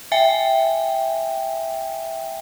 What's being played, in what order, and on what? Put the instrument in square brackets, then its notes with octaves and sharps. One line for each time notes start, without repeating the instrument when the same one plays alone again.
[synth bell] E5 G5 G#5